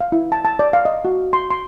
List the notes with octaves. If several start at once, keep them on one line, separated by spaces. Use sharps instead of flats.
F5
E4
A5
A5
D5
F5
D#5
F#4
C6
C6